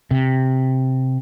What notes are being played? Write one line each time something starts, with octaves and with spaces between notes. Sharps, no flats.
C3